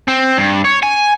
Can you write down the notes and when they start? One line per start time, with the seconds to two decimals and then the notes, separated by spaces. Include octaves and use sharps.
0.08 C4
0.37 G2
0.65 C#5
0.83 G#5